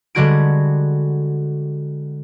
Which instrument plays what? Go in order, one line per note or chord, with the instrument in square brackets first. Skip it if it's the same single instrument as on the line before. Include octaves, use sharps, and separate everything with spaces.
[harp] D3 G3 G#3 F#4 G#6 D7